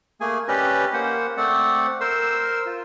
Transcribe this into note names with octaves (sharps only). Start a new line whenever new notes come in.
A3 A#3 G#4 G#5
C#4 G4 B4 D5 D#5
A#3 C5 F#5
A3 C4 D5 F#5
A#4 C5 C6 E6
F4